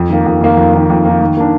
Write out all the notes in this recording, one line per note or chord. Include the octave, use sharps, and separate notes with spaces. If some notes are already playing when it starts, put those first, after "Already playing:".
Already playing: F2
D#3 A#3
F2
D#3 A#3
F2
D#3 A#3
F2
D#3 A#3
D#3
A#3 D4